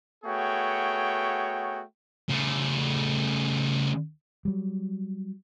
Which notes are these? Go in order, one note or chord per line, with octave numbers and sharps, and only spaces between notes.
A3 B3 F#4 G#4 C#5 G5
C#3 A3
F#3 G3